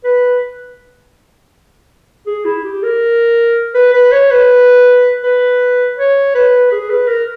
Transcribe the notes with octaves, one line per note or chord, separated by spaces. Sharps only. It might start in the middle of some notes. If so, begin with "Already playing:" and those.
B4
G#4
E4
G4
A#4
B4
B4
C#5
B4
B4
C#5
B4
G#4
B4
A#4